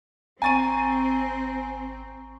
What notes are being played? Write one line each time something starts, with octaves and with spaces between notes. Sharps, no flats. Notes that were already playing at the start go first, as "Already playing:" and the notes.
G#1 C4 G#5 A#5 C#6 A6 D#7